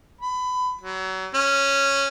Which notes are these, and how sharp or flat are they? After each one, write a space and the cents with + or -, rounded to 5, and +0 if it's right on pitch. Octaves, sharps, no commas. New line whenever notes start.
B5 +25
F#3 +30
C#4 -5